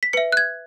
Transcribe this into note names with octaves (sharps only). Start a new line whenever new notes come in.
B6
B4 E5 C#7
F#6
G#6